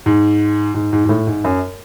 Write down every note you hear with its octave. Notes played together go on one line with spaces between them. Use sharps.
G#2
G#2
G#2
G#2
A2
G#2
F#2